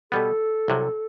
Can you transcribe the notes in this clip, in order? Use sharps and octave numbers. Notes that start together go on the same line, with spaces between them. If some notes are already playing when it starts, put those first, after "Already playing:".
B2 G3 B3 A4
C2 C3 F#3